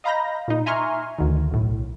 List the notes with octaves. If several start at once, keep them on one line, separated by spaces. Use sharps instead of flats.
D#5 F5 A#5 B5 G6 A#6
A#2 D#4
E5 G#5 A#5 C6 C#6 F6
D2 D#3
B1 A2